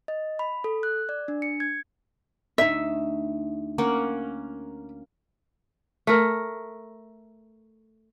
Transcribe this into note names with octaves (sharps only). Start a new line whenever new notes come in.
D#5
B5
A4
F#6
D5
D4
C#7
G#6
D2 D#4 E5
A#3 C#4 F#5
A3 A#4